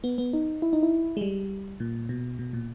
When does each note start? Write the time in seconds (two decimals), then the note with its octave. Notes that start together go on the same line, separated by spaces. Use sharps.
0.04 B3
0.18 B3
0.33 D#4
0.62 E4
0.73 D#4
0.83 E4
1.17 G#3
1.21 G3
1.80 A#2
2.09 B2
2.39 B2
2.53 A#2